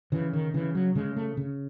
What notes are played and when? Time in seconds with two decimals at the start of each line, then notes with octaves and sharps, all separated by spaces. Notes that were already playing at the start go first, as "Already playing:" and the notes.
0.12 C#3 E3
0.33 D#3
0.54 C#3 E3
0.75 F#3
0.95 C#3 G#3
1.16 A3
1.37 C#3